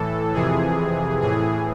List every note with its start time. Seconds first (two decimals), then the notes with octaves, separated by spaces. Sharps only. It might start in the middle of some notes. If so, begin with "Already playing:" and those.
Already playing: A2 E3 A4
0.34 F2 C3 E3 G#4
1.21 A2 E3 G#4